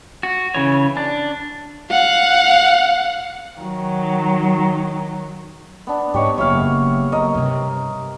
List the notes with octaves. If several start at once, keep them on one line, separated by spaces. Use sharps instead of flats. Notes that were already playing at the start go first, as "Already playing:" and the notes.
F#4
C#3 E3 C#5
D4
F5 F#5
D#3 F#3
B3 D4
G#2 G4 C#5 D#5
F#1 F#2 C#5 E5 F5
F#1 A#4 D#5
G2 C3